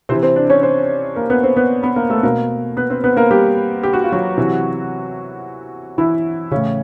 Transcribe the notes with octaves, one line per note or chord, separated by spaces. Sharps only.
C3 E3 C4 C5
C4 C5
D4 D5
C#4 C#5
C4 C5
A#3 A#4
B3 B4
C4 C5
B3 B4
B3 B4
A#3 A#4
A3 A4
B2 A#3 A#4
B3 B4
C4 C5
B3 B4
A#3 A#4
G3 G4
G4
F#4
F4
F#3 F#4
C3 E3
E3 E4
A2 C#3 E3 C#4